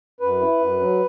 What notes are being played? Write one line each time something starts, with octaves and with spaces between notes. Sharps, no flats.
F#2 B4
E4
F#2
F#3